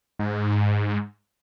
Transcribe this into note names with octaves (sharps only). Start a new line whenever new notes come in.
G#2